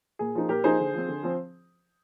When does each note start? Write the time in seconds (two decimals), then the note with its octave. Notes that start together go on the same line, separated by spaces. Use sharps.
0.19 A#2 G#4
0.35 F3 A#3 D#4
0.49 A#2 G4 A#4
0.64 F3 A#3 D#4 G#4 C5
0.80 D3
0.94 F3 C4
1.09 D3
1.23 F3 C4